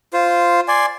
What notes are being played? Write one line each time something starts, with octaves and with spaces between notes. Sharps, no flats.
F4 C5
D5 G#5 C6